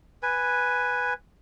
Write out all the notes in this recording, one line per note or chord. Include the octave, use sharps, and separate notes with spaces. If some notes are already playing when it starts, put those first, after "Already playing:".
B4 G#5